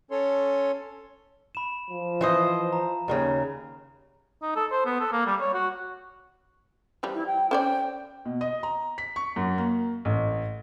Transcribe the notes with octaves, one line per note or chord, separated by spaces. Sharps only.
C#4 A4 C#5 C6
B5 E7
F3
E3 C5 D#5
A#5
D#2 A#2 C#3
D#4
A4
C5
B3
A4
A#3
G3
C#5
F#4
E3 F3 G3
E4
G5
C#4 C5 D5 G5
B2
D#5
A#5
B6
C#6
F#2
A#3
A1